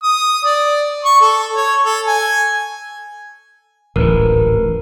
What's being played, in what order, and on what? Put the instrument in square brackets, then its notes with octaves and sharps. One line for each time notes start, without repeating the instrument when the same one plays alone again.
[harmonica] D#6
D5
C#6
A4
C#5
A4
G#5
[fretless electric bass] D1 [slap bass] A1 G#2 [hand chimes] A#4 B4